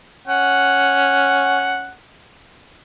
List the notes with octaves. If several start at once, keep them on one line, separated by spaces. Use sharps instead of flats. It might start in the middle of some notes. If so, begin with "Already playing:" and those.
C#4 F#5